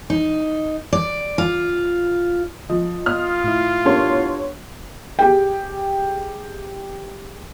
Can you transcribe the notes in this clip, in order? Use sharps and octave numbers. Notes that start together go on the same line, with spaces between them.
D#4
D5
F4
F3 D#5
F4 D#6 F6
A2 E4
B3 D4 G4 A#4 C#5 C6
G4 G#4 G5